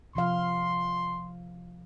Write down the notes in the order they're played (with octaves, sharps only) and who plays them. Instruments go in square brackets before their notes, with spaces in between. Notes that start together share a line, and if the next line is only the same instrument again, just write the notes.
[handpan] C3 F3 F5 [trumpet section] C6